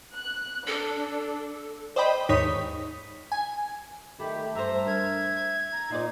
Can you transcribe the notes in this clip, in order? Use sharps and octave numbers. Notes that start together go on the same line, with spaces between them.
F#6
D4 A4
C5 D5 D#5 G5 B5
D#2 G#2 D#4 C#5 D#6 B6
G#5
D#3 A3 G4 B5
G2 C5 E5 A#5
A#4 G#6
A#5
A#2 D#4 F4 D5